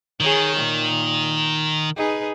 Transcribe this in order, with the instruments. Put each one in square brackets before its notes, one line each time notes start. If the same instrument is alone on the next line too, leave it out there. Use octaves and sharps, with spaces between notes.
[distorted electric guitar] D#3 [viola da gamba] G#4 C#5
[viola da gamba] A#2
D#4 G#4 B4